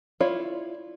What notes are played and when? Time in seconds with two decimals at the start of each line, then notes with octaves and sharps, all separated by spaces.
0.20 E4 F4 C#5 D5 F5